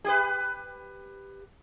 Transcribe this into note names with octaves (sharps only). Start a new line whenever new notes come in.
G4 B4